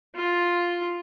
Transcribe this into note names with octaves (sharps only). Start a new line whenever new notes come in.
F4